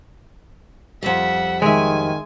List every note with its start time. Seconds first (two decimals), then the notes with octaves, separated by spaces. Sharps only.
1.03 F2 G3 E5 F#5
1.62 D#3 G#3 E5 G#5